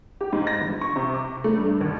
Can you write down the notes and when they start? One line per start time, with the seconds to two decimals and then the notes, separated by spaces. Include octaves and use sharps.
0.21 G4
0.32 G#2
0.47 A#6
0.60 G1
0.81 C#6
0.96 C3
1.14 D6
1.44 A3
1.58 G2
1.81 D#2